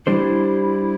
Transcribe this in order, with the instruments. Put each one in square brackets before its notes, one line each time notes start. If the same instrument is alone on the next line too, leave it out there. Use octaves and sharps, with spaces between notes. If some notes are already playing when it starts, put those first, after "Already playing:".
[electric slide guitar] G3 D4 G4 C5 [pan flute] E4